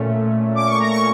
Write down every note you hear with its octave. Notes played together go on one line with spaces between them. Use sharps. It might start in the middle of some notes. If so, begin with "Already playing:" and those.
Already playing: A#2 A3 C#4
D6
C#6
A#5
C#6